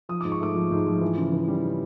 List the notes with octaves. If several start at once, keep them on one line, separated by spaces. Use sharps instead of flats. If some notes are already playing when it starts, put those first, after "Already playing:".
F3 D#6
G#2 D6
C#6
A3 D6
F3
G#2
F3
E3
C#3
E3
G3
C#3